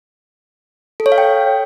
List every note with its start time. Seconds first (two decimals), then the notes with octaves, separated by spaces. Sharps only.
1.00 A4
1.06 C#5
1.12 F5
1.18 G5